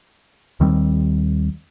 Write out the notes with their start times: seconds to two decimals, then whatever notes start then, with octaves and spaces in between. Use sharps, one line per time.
0.60 D#2 D#3 G3 C4